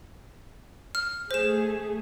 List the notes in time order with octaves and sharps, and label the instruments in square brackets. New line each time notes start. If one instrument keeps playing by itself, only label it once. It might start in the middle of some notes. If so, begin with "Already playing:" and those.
[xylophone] F6
[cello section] A3 G#4 [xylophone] C5 E7